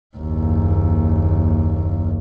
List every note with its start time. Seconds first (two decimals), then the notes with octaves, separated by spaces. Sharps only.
0.17 F#1 D#2